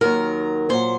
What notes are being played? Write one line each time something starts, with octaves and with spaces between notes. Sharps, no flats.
D#2 D#3 F#3 A#4
A#2 F#3 C5